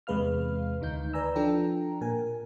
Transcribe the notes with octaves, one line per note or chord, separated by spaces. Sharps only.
E2 C3 G#3 B4 F5 F6
D2 D#3 D#4 G6
B4 D5 G#5 A#5 E6
F3 D4 A4 G5 A#5
A#2 A#4 G#5